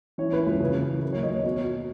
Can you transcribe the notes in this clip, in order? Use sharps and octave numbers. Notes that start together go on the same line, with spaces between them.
E3 C#5
E3 B4
C#2 B4
C#3
C#3
E3
F#3 A#4
D#2 C#5
D#5
D#2 C#5
B2 C#5
B2